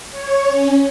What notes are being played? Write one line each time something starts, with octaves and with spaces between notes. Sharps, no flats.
C#5
C#4